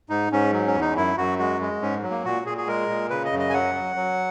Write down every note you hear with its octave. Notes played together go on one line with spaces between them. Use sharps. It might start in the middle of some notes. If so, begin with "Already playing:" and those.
G#2 D#4
G#2 C#4
F#3
C#4
E2
D#4
F#2 E4
F#2 F#4
G#3 F#4
G#3
G#2 C#4
F#3
A#3
A#2 F#4
A#2 G#4
G#4
G#3 A#4
A#2
C#3 B4
D#5
F#2
D#5
G#5
F#3 F#5
F#3
F#3